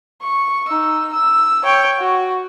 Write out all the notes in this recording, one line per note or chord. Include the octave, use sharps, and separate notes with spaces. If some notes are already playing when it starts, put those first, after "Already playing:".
C#6
D#4 E6
E6
C#5 G5
F#4